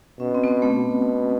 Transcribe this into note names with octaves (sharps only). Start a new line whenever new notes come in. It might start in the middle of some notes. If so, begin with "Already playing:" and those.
B2 C#4
C4
B3
C4
A3
B2